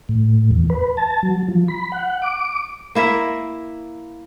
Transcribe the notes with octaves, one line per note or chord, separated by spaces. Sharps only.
A2
E2
B4
A5
F#3
F3
B5
F#5
D6
A#3 E4 A#4 E5